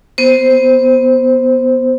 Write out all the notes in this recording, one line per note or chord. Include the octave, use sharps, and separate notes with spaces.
B3 C5